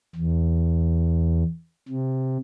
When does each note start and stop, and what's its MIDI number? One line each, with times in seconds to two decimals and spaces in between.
0.15 1.43 40
1.89 2.38 48